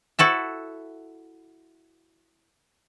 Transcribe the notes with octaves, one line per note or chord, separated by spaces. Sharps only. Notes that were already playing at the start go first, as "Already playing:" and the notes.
E4 F#4 A4 E5